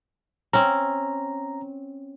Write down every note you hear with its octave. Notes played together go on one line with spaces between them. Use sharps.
C4 C#4 A#5